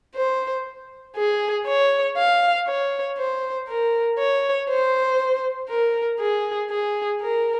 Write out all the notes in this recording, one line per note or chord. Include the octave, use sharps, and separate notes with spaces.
C5
G#4
C#5
F5
C#5
C5
A#4
C#5
C5
A#4
G#4
G#4
A#4